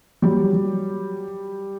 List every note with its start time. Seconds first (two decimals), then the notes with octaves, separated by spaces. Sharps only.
0.22 F#3 G3 G4
0.53 F#3